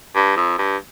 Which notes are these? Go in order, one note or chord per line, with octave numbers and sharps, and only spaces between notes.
G2
F2
G2